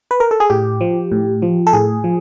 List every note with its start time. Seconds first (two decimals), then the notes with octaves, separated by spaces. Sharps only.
0.11 B4
0.20 A#4
0.31 A4
0.40 G#4
0.50 A2 G4
0.81 F3
1.12 A2
1.42 F3
1.67 A4
1.73 A2 G#4
2.04 F3